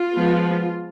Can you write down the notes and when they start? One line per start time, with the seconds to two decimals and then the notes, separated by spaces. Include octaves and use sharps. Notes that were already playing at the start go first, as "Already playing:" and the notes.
Already playing: F4
0.14 F3 G#3 B3